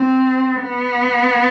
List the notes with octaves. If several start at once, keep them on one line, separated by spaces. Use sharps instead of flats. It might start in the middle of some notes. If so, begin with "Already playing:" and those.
Already playing: C4
B3